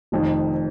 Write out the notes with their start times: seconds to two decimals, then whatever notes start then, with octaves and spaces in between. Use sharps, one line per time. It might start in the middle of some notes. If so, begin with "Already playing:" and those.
0.12 F1 F2 D#3